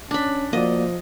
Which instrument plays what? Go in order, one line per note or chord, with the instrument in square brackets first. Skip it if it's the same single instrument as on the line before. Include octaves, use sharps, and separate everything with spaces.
[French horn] C#4 [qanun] D4 B5
[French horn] F3 [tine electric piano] A#3 F#4 D5 [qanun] D#5